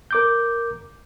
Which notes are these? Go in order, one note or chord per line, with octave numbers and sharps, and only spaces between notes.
A#4 D6 G6